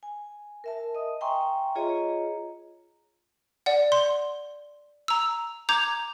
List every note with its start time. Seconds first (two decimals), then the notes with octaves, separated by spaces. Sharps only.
0.03 G#5
0.64 A#4 E5 A5
0.95 D#5 D#6
1.21 E5 G5 G#5 A#5 C6 C#6
1.75 F4 G#4 C#5 D#5 A#5
3.66 D5 F#5
3.92 C6
5.08 A#5 E6
5.69 A#5 D6 G6 G#6 F7